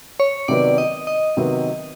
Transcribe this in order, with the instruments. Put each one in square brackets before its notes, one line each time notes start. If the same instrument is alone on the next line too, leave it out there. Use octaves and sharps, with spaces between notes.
[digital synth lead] C#5
[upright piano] C3 D#3 F#3 B3 [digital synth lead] D5
[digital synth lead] D#5
D#5
[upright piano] C3 D#3 F#3 B3